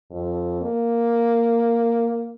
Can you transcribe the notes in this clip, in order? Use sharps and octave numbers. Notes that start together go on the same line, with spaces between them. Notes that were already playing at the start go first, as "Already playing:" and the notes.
F2
A#3